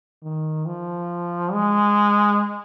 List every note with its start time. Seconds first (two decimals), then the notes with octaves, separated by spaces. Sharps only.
0.23 D#3
0.66 F3
1.52 G#3